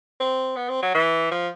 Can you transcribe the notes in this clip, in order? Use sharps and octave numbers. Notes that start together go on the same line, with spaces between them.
C4
B3
C4
F#3
E3
F3